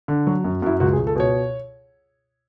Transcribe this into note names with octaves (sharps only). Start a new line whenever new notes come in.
D3
F#3 F#4
F#2
F#2 E4
C#2 F#4
G#4
C#2
A4
B2 C#5